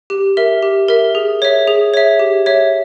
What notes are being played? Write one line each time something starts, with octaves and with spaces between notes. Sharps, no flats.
G4
A#4 E5
G4
A#4 E5
G#4
C#5 E5
G#4
C#5 E5
G4
C#5 E5